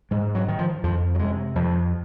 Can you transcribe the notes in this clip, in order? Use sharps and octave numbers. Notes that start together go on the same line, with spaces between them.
G#2 G#3
F#3
D#3
F3
F2 F3
F#3
C3 G#3
F2 F3